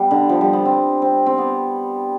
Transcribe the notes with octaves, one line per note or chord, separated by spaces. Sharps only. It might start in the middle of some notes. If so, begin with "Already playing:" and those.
Already playing: G3 B3
D3
F3
G3
B3
C4
C4
C4
B3